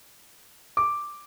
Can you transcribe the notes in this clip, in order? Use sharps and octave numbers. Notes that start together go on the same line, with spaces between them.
D6